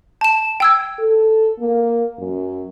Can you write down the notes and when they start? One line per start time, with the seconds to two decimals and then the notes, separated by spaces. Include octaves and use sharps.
0.21 A5 E7
0.60 G5 E6 G#6
1.00 A4
1.60 A#3
2.18 F#2